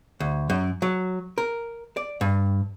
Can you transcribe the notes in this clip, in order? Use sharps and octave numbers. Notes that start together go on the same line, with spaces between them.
D2
F#2
F#3
A#4
D5
G2